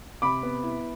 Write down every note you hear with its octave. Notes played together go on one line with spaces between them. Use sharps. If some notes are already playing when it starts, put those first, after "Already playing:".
C3 B5 D6
B3
E4